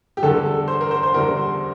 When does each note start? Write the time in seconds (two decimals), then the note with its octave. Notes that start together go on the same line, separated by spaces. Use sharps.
0.17 G4
0.23 E2 D3 G3 A4
0.46 A4
0.68 C5
0.81 A#4
0.91 C5
1.03 C5
1.14 E2 D3 G3 A#4
1.37 C5